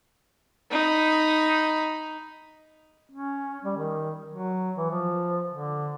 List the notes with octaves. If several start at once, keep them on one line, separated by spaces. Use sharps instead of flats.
D#4 B5
C#4
G3
D#3
F#3
E3
F3
D3